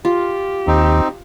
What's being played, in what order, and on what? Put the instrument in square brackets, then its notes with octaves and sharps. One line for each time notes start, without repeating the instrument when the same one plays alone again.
[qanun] F4 [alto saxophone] G4
[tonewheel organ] D#2 [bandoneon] C4 D#4